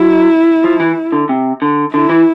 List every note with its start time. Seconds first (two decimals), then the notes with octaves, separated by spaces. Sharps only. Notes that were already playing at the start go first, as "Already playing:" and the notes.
Already playing: F#3 E4
0.64 F3
0.80 E3
1.12 D3
1.29 C3
1.62 D3
1.94 D3 E4
2.09 E3